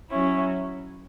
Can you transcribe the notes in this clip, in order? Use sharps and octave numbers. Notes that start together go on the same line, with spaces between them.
F#3 C#4 E4